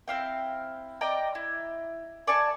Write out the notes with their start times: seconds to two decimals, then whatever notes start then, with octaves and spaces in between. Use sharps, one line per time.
0.08 C4 E4 F5 G5
1.01 D5 D#5 G5 A#5
1.35 E4
2.27 D5 G#5 A5 C#6